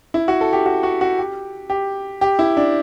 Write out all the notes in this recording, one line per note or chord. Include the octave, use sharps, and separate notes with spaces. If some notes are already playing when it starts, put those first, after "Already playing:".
E4
F#4
A4
G4
F#4
F#4
F#4
G4
G4
G4
E4
D4